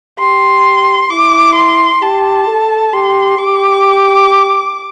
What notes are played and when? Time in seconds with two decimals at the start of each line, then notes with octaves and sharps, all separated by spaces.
0.19 G4 C6
1.10 E4 D6
1.56 C6
2.02 G4 A5
2.47 A4
2.93 G4 C6
3.38 G4 D6